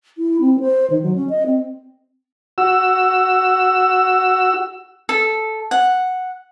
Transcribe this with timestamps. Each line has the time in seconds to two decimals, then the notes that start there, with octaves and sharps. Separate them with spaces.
0.18 E4
0.41 C4
0.60 C5
0.90 D#3
1.02 F#3
1.15 C#4
1.29 D#5
1.46 C4
2.58 F#4 E6
5.09 A4
5.71 F#5